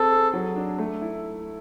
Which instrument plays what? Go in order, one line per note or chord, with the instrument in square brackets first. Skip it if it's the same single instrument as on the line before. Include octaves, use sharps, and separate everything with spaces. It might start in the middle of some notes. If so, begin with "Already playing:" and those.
Already playing: [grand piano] C4 G#4 [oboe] A4
[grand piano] G#4
F#3
D4
A3
E4